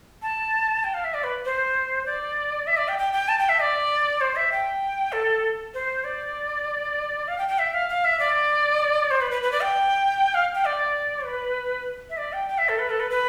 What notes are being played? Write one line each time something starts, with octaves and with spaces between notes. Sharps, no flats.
A5
G5
F5
E5
D5
B4
C5
D5
E5
D5
G5
G5
G5
A5
G5
E5
D5
C5
E5
G5
A4
C5
D5
F5
G5
G5
E5
F5
F5
E5
D5
C5
B4
B4
B4
D5
G5
F5
G5
D5
B4
E5
D5
G5
G5
E5
A4
B4
A4
B4
B4